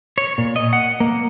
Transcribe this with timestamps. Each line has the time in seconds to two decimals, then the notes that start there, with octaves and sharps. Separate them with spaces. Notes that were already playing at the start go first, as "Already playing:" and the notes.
0.18 C#5
0.38 A#2
0.56 D#5
0.73 F#5
1.00 A#3